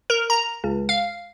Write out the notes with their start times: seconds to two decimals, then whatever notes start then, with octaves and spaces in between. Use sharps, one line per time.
0.10 A#4
0.30 A#5
0.64 C#2
0.89 F5